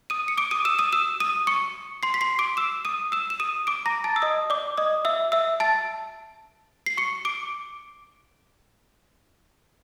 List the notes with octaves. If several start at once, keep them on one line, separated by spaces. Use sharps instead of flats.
D#6 D#7
C#7
D6 D7
D#6 D#7
E6 E7
D#6 D#7
E6 E7
D#6 D#7
C#6 C#7
C6 C7
B6
C6 C7
D6 D7
E6 E7
D#6 D#7
E6 E7
E7
D#6 D#7
D6 D7
A#5 A#6
A5 A6
E6
D#5 D#6
D5 D6
D#5 D#6
E5 E6
E5 E6
A5 A6
C7
C#6 C#7
D6 D7